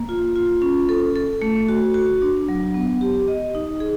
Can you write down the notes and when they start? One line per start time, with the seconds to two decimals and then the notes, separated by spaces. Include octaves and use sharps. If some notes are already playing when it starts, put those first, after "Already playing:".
Already playing: A#3
0.09 F4
0.35 F4
0.62 C#4
0.89 A4
1.16 A4
1.42 A3
1.69 F#4
1.94 F#4
2.22 D4
2.49 F#3
2.74 B3
3.01 G4
3.28 D#5
3.55 D#4
3.80 G#4